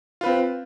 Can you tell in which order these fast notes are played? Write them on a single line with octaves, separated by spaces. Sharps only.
F4 B4 C4